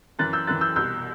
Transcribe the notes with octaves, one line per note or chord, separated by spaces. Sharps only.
F#2 E3 F#6 A6
E6 G6
F#2 E3 F#6 A6
E6 G6
C2 B2 E6 G6